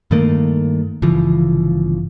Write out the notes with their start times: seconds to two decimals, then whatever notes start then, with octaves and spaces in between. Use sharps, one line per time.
0.11 G2 D#3 A3 A#3
1.02 G1 C#3 E3 F3